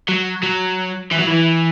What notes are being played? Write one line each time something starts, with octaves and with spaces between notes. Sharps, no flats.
F#3
F#3
E3
F#3
E3